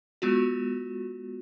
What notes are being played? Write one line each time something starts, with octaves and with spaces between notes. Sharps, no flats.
G#3 B3 F4 F#4